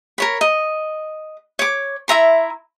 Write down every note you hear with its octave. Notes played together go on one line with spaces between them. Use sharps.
A#4 C#5 B5
D#5
C#5 D6
E4 E5 A#5 C6